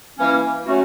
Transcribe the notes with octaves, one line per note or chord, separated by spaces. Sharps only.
E3 G3 A#3 C#4
F#3 A3 C#4 F#4